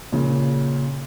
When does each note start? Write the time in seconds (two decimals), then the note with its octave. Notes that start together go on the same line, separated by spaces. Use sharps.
0.12 A#2 C#3